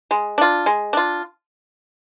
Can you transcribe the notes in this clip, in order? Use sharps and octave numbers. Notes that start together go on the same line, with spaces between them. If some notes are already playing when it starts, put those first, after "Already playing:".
G#3
D4 F4
G#3
D4 F4